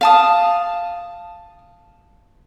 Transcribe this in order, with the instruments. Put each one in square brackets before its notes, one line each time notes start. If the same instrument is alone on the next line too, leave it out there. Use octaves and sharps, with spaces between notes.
[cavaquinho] F5 A5 D#6